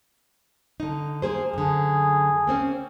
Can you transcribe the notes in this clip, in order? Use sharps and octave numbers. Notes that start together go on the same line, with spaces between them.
D3 D#4
A#3 G#4 C5
F#2 D3 G#4
A#3 C4 C#4